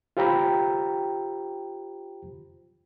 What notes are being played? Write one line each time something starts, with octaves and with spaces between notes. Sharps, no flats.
F4 G4 C5 G5 A#5 B5